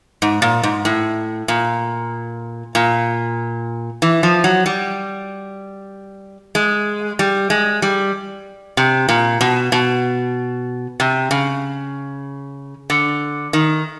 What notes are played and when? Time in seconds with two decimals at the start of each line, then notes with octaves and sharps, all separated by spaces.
0.22 G#2
0.42 A#2
0.63 G#2
0.85 A2
1.48 A#2
2.75 A#2
4.02 E3
4.23 F3
4.44 F#3
4.66 G3
6.55 G#3
7.19 G3
7.50 G#3
7.82 G3
8.77 C3
9.09 A#2
9.41 B2
9.72 B2
11.00 C3
11.31 C#3
12.90 D3
13.53 D#3